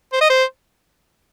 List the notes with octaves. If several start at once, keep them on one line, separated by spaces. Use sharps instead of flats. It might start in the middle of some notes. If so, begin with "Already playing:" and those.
C5
D#5
C5